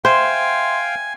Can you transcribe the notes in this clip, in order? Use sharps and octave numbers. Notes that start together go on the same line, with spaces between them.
C5 E5 F5 G5 G#5 C6